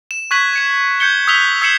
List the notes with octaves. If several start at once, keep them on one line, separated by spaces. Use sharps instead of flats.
E7
C#6 F#6 G#6 B6 F#7
G#6 C#7 E7
G6 G#6 C#7 G7
D#6 E6 F#6 B6 F7 G7
E6 G#6 C7 C#7 E7 F#7